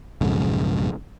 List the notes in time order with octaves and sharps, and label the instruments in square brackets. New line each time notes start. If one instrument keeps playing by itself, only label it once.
[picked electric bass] B1 F2 G#2 C#3